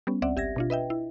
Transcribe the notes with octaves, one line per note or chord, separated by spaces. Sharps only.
G3 B3 C#4
C#2 C4 D5 E5 F#5
G#1 G4 E5 G#6 A#6
B2 D4 F4
B4 D#5 E5 G5
E4